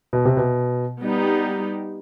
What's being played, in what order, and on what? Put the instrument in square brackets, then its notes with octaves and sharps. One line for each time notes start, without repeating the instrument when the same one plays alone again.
[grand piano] B2
C3
B2
[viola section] G3 B3 D#4 G4